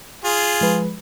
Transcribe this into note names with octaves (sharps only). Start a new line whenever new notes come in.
F4 G#4
F3 G#3 B4